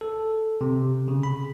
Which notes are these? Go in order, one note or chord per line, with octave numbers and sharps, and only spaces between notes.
A4
C3
C#3
B5